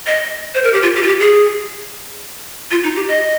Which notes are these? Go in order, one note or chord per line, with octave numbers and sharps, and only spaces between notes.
D#5
C5
A#4
G4
F4
G4
F4
G4
G#4
F4
D#4
G4
D#5